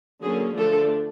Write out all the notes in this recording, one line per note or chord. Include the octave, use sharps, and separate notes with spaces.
D3 F#3 A#3 C#4 G#4
D3 F3 A3 D4 A4